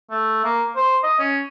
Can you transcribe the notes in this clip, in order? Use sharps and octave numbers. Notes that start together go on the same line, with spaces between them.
A3
A#3
C5
D#5
C#4